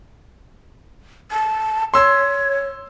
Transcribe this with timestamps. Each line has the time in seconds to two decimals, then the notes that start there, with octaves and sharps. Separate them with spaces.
1.31 A5
1.94 C#5 C6 E6